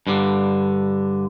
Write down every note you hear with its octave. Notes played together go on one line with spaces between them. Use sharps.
G2 D3